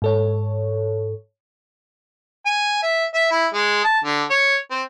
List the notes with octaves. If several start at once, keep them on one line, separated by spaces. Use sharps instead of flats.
G#2 A4 C#5
G#5
E5
E5
E4
G#3
A5
D3
C#5
C4